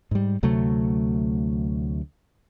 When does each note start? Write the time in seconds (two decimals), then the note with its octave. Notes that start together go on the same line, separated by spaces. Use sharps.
0.11 G#2 G3
0.43 D2 C3 F#3 A3